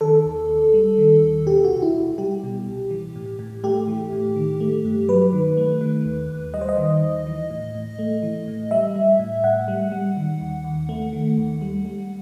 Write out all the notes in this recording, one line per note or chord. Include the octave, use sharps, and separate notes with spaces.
D#3 A4
D#2
D#2
G3
D#3
D#2
B2 G4
F#4
C2
E4
C2
G3 G4
B2
C2
E3
A2
A2
A3 G4
E3
A2
D#3
A3
G2
F#3 B4
D#3
A3
D#3
D#2
D#2
G3 D#5
C5
D#5
D#3
D#2
E3
A2
A2
A3
E3
A2
G3 E5
G3
A2
A2 F#5
G3
G3
D#3
D#2
D#2
A3
D#3
D#2
G3
G3